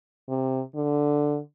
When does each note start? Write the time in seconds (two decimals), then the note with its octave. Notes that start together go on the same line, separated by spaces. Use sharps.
0.29 C3
0.75 D3